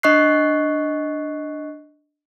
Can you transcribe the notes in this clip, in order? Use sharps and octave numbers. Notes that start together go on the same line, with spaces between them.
D4 D#5 C#6 F#6 C7